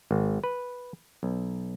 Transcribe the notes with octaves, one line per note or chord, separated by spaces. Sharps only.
G#1
B4
B1